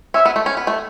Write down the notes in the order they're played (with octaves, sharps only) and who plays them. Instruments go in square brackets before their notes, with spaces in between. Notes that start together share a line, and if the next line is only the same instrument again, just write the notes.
[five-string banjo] C#4 [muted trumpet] E5
[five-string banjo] B3
A3
C#4
B3
A3